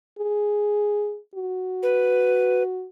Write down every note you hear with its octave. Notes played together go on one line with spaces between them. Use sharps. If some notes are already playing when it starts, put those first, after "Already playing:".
G#4
F#4
B4